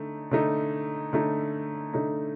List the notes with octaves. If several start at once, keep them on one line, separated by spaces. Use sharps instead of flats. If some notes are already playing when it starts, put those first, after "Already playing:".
Already playing: D3 A3 D#4
D3 A3 D#4
D3 A3 D#4
D3 A3 D#4